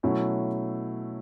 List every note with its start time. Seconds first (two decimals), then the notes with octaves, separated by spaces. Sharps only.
0.03 B2 F#3 A3 C#4 E4